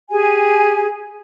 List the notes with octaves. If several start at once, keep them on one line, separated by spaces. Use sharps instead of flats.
G4 G#4 G#5